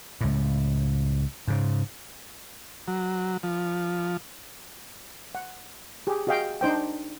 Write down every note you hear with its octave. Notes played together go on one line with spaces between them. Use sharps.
C#2 A2
G#2 C#3
F#3
F3
F#5
G4 G#4
F#4 G#4 D#5 F5 G5
D4 D#4 C5 G5